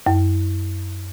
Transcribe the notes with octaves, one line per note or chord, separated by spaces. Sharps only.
F#2